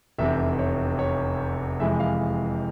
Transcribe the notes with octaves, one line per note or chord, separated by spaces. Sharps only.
F1 E2 C3 E5
C#5
C#5
F2 C3 E3 G#3 E5
F5